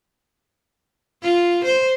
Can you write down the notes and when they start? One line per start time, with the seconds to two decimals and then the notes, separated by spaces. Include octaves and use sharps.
1.22 F4
1.65 C5